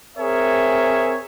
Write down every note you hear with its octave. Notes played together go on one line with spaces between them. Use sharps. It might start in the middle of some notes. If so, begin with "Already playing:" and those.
C4 G#4 A#4 C#5 E5